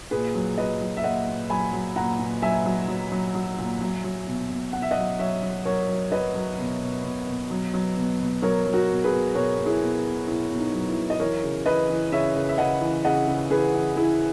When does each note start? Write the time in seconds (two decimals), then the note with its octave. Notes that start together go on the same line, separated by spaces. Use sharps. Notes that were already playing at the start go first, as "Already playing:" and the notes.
0.11 A#2 G#4 B4
0.35 F#3
0.58 F#3 B4 D#5
0.81 F#3
0.97 E5
1.04 A#2 D#5 F#5
1.27 A#2
1.50 F#3 G#5 B5
1.73 F#3
1.96 A#2 F#5 A#5
2.19 A#2
2.42 F#3 E5 G#5
2.65 F#3
2.88 F#3
3.12 F#3
3.35 F#3
3.58 A#2
3.81 F#3
4.04 F#3
4.27 B2
4.50 B2
4.73 B2 F#5
4.82 E5
4.91 D#5 F#5
4.97 F#3
5.19 F#3 C#5 E5
5.43 F#3
5.65 F#3 A#4 C#5
5.89 F#3
6.12 F#3 B4 D#5
6.35 F#3
6.58 B2
6.81 B2
7.04 B2
7.27 B2
7.50 F#3
7.74 F#3
7.97 B2
8.20 B2
8.42 F#3 A#4 C#5
8.66 F#3
8.74 F#4 A#4
8.89 B2
9.04 G#4 B4
9.11 B2
9.35 B2 A#4 C#5
9.58 B2
9.66 E4 G#4
9.81 B2
10.05 B2
10.27 B2 E4
10.50 B2
10.58 D#4
10.74 F#3
10.89 E4
10.97 F#3
11.10 D#5
11.20 E3 A#4 C#5
11.43 C#3
11.66 E3 B4 D#5
11.89 E3
12.12 C#3 C#5 E5
12.35 C#3
12.49 E5
12.58 C#3 D#5 F#5
12.81 E3
13.04 C#3 D#5 F#5
13.28 C#3
13.50 E3 G#4 B4
13.74 E3
13.96 E3 E4 G#4